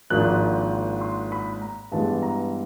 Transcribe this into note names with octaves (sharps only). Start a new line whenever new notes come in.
G#1 G#2 F3 A#3 D4 F#6
C6
B5
A#5
G2 E3 G#3 B3 A5
A#5